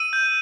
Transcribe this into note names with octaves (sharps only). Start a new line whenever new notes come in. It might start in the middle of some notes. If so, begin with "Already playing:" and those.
Already playing: E6 D#7
G6